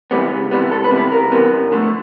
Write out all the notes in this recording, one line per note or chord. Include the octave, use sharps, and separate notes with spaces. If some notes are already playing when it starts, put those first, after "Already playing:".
C3 E3 G3 B3
C#2
C3 E3 G3 B3
C#2 A4
B4
C3 E3 G3 B3
B4
C#2 A#4
C3 E3 G3 B3
F#2
D3 F3 A3